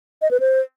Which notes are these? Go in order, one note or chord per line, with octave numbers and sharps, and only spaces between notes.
D#5
B4
C5